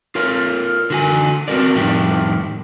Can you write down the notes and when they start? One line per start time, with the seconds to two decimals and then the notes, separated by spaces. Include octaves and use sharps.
0.15 F4 A#4 C#5
0.90 D3 F#4 G#5
1.48 C4 C#4 F#4 A#4 D5
1.75 F2 A2 D#3 G4